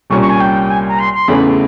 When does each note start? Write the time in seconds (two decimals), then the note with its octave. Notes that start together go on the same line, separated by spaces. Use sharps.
0.10 C2 A#2 G3 A#3 C#4 C#6
0.20 C#6
0.29 G#5
0.40 G5
0.69 G#5
0.88 A#5
0.99 C6
1.13 C6
1.28 E2 C#3 E3 A3 C#4 B5